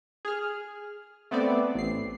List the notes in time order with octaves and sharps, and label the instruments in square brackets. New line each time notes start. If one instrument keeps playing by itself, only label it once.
[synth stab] G#4 F6
A3 B3 C4 D5
A1 C7